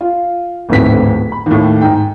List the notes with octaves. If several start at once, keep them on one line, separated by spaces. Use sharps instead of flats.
F4
D1 G#1 F2 A2 B3 B6
B5
D#2 A2
G#2 G5